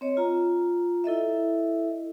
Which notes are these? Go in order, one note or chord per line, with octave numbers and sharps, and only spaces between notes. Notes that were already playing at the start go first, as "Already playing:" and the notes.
C4 C#5 D#5
F4 A#5
E4 A4 D#5 E5